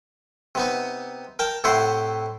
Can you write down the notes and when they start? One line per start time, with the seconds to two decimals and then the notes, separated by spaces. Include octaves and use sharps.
0.55 C3 B3 D#4
1.39 A#4 G5 A5
1.64 A2 C3 E4 C5 F#5